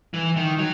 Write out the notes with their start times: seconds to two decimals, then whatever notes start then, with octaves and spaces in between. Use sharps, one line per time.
0.14 E3
0.36 D#3
0.59 F#3